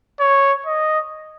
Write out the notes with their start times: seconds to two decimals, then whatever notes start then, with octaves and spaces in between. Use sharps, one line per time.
0.20 C#5
0.66 D#5